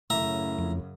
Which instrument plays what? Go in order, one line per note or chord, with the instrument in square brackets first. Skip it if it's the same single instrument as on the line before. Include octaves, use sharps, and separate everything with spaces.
[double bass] F#2 C#3 [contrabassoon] A2 [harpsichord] E5 A#5
[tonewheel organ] F2